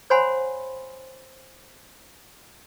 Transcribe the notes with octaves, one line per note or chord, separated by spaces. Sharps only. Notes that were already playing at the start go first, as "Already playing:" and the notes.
C5 C#5 F#5 G#5 B5 C6